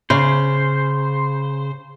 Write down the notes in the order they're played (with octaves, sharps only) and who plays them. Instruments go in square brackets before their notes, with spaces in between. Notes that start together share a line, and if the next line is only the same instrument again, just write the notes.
[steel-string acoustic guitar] C#3 [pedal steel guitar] C5